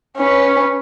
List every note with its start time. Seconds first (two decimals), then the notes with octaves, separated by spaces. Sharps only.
0.17 C#4 B4